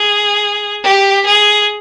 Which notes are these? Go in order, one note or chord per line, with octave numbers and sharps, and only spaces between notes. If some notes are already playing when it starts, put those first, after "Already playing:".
Already playing: G#4
G4
G#4